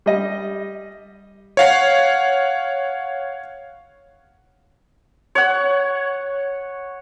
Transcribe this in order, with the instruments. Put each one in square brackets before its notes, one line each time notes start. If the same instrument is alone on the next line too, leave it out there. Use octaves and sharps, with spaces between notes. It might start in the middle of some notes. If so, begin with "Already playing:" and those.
[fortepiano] G3 D#5
[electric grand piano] C#5 F5 F#5
[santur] C#5 F#5